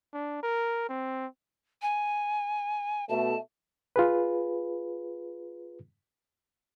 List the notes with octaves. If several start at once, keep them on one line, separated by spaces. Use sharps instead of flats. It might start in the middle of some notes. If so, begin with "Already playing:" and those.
D4
A#4
C4
G#5
B2 A3 A5
F4 G#4 B4